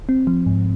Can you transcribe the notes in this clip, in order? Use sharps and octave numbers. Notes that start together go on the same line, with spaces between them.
C4
F3
G#2